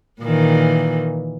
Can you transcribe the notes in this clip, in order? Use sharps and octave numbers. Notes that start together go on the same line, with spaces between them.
A#2 D#3 E3